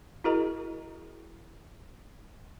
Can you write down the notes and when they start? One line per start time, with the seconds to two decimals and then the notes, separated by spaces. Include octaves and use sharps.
0.24 E4 F#4 G#4 A#4 D#5 A#5